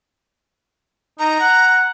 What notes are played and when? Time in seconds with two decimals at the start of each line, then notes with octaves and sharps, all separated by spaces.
1.19 D#4 A#5
1.40 F#5